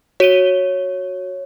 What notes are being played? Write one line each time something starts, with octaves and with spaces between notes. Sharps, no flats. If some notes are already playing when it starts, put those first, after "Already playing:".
F#4 C#5 D#7 G7